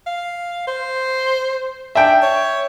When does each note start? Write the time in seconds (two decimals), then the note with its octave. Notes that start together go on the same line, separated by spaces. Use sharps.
0.07 F5
0.67 C5
1.95 D4 E5 G5
2.22 C#5